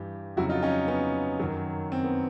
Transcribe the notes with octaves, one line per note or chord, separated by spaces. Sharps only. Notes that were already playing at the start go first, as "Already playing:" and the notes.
Already playing: G2 E3 G4
F2 C#3 F#3 E4 F#4
D#4 F4
C#4 D#4
B3 C#4
F#2 D#3 F#3
C4
B3